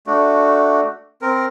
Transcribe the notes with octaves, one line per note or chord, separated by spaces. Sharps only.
A3 D4 F#4
C4 A#4